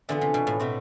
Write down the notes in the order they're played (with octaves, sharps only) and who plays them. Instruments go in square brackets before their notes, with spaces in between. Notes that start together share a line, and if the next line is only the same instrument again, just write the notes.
[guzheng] D3 [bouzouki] E3 B3 F4 A4
[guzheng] C3
B2
A2
[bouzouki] B2 A3 C4